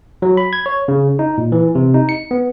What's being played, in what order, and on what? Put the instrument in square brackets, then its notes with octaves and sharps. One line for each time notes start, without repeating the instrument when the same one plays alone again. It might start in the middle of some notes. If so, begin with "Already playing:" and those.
[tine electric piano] F#3
B5
G#6
C#5
C#3
D#4
A#2
E3
C3
D#4
C#7
B3